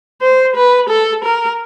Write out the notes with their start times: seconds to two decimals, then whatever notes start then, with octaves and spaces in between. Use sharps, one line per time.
0.22 C5
0.56 B4
0.90 A4
1.24 A#4